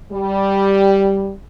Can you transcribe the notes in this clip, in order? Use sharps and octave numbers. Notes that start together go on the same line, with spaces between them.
G3